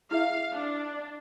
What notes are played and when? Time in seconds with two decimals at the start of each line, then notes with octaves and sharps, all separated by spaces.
0.11 E4 G#4 E5 F5
0.53 D4